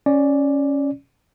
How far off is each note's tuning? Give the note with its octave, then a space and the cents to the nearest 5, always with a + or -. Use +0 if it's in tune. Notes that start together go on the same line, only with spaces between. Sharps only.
C#4 +0 D5 +0